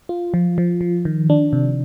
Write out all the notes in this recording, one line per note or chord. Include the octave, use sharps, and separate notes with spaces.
F4
F3
F3
F3
D#3
D4
C3